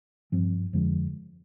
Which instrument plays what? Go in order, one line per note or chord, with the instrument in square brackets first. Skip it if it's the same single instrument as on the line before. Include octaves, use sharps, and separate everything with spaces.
[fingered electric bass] G2 F3 C4
F2 D3 F3 G#3